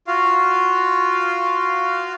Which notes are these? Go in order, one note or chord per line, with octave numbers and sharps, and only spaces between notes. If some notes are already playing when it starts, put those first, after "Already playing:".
F4 F#4 F5